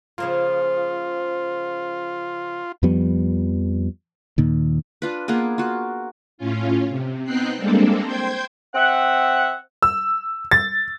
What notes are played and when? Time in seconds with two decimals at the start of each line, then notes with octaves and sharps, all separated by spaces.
0.18 C#3 F3 A#3 F4
2.83 F2 F3 G3 B3
4.38 D#2 A#2 D#3
5.02 D4 F4 B4
5.28 A#3 B3 F4 G#4
5.58 F4 F#4
6.38 A2 C#4 F4
6.89 C3
7.25 B3 C4 D#4 G5 F#6 C7
7.57 G3 G#3 A#3 C4 D4 A4
8.03 C5 G5 C6 G6 G#6
8.75 C4 E5 F#5
9.82 E6
10.51 A6